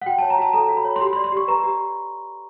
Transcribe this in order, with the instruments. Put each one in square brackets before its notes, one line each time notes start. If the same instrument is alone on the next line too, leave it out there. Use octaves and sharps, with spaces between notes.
[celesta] F#5
F#4 G5
C#5 A5
A#5
F#4 A5
A4 A#5
F#4
B5
C#5
C6
G4 B5
C6
D5
C6
G4 C#6
B4 A#5
G4